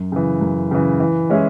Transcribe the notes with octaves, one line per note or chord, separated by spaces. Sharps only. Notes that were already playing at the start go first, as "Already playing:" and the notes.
Already playing: F#2
C#3 E3
F#2
C#3 E3
E3
G#3 C#4 E4 G#4